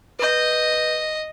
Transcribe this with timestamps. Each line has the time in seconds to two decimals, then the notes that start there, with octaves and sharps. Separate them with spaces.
0.19 B4 D#5 G6